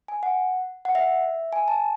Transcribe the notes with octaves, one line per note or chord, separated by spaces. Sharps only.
G#5
F#5
F#5
E5
G#5
A5